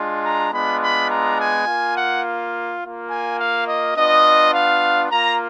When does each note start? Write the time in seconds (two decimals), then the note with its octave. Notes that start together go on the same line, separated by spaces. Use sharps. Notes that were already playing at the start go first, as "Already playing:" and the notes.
Already playing: G#3 D4 F4
0.24 A#5
0.52 G#3 B3 D4 F4 B5
0.81 B5
1.10 A#5
1.39 G#5
1.67 A#3 F4
1.96 F#5
2.82 A#3 F4
3.10 G#5
3.39 F5
3.67 D#5
3.96 B3 D4 F4 D#5
4.54 F5
5.10 A#3 F4 A#5